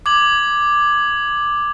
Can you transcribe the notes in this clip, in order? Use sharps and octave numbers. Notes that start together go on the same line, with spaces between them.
D6 G#6 F#7